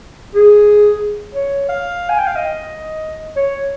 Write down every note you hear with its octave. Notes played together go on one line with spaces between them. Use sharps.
G#4
C#5
F5
G#5
G5
F5
D#5
C#5